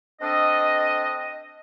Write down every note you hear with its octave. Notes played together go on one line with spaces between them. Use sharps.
C4 D4 A4 D#5